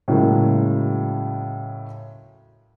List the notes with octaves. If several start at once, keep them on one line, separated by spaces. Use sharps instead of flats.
A2 C#3 F#3 G#3 A#3